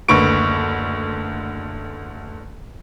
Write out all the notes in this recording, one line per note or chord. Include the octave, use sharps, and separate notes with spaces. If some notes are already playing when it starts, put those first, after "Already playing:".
F#1 D2 D3 B4 C#6 D7